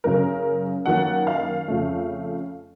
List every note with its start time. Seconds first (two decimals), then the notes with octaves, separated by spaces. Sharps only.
0.04 F#1 F#2 C#3 A#4
0.86 F#2 D#3 A#3 F#5
1.27 F5
1.68 F2 C#3 A3